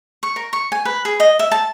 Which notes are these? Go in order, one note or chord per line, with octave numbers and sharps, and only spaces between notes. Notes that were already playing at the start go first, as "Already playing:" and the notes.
C#6
A#4
C#6
G#5
B4
G#4
D#5
E5
A5